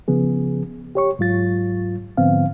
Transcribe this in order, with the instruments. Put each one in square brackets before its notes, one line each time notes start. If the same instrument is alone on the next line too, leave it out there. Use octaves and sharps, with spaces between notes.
[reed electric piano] C#3 F3 B3 G#4
G4 C#5 C#6
G#2 F#3 F4 A6
G#2 D3 F3 B3 C4 F5